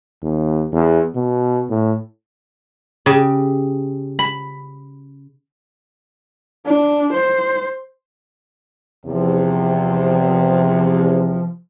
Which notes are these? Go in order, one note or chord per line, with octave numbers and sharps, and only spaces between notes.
D#2
E2
B2
A2
C#3 G4
B5
D4
C5
E2 C3 F3